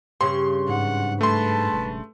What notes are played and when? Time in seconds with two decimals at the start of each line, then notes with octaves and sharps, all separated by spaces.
0.21 G2 C#3 C6
0.69 G#2 F#5
1.21 A3 B4 A5 C6
1.73 E1